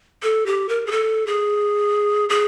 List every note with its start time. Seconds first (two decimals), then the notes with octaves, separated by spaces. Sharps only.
0.23 A4
0.46 G4
0.69 A#4
0.86 G#4
0.92 A4
1.27 G#4
2.29 G#4